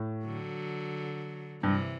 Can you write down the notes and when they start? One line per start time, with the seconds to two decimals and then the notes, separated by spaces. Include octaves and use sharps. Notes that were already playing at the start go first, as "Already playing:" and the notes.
Already playing: A2
0.25 D3 F#3
1.62 G2 C3 E3